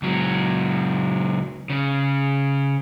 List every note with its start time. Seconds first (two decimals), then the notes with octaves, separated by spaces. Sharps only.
0.02 C#2 F#3
1.70 C#3